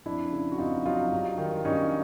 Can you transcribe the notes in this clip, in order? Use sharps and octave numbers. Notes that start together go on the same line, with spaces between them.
F2 D4 E4
C#3
F#4
F2 D#4 F4
F#3 D#4 F4
G2
D#3
G2 C#4 D#4